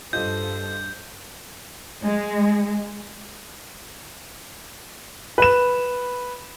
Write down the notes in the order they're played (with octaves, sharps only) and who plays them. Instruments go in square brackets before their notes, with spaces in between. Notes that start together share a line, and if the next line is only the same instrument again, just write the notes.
[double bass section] G2 [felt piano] F4 G4 D#5 [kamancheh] A4 C5 [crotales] G6
[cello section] G#3
[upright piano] B4 E7